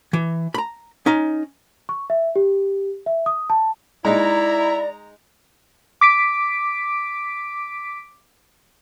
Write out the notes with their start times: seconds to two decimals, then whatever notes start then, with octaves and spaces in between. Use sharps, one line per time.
0.13 E3
0.54 A#5 B5
1.06 C#4 D#4
1.89 C#6
2.10 E5
2.36 G4
3.06 E5
3.26 D#6
3.50 A5
4.05 G#3 D#4 E4 D5 A#5
6.01 D6 B6 D7